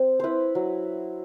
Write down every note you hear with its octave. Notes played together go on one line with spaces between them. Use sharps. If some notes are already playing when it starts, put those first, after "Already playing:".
Already playing: C4
E4 B4 C5
F#3